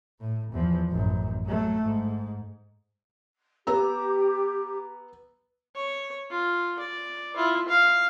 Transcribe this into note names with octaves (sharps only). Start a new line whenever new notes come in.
A2
E2 F3
A1 F#2
F#3 A3
G#2
B3 G4 A#5 E6
C#5
F4
D5
E4 F4
F5